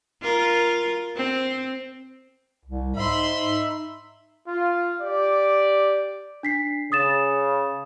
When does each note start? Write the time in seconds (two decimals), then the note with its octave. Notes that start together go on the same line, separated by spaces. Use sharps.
0.22 F4 A#4
1.16 C4
2.65 C2
2.96 G#2 D#4 E5 B5 C6
4.48 F4
5.01 G4 D5
6.43 D4 B6 C7
6.92 C#3 D#6 A6 E7